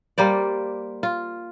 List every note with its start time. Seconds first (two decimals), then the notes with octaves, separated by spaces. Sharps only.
0.18 G3 A#3 C5 D5
1.03 F4